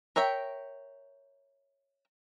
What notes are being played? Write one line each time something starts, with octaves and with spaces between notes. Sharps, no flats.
A#4 C#5 E5 G5